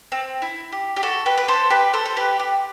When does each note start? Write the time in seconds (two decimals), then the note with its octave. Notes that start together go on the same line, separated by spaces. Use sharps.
0.12 C4
0.42 E4
0.72 G4
0.96 G4
1.03 F#4 A4
1.26 G4 B4
1.38 B4
1.48 A4 C5
1.70 G4 B4
1.93 A4 C5
2.06 A4
2.17 G4 B4
2.39 G4